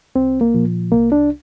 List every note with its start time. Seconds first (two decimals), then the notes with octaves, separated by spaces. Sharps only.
0.15 C2 C4
0.41 A#3
0.54 A#2 F3
0.92 C2 A#3
1.12 D4